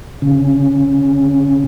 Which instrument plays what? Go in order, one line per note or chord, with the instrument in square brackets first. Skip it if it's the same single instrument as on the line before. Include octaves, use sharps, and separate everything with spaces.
[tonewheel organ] C#3 C#4